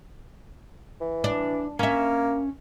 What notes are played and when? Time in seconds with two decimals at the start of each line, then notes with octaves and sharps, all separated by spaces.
1.01 E3
1.24 D4
1.79 A#3 C#4 E5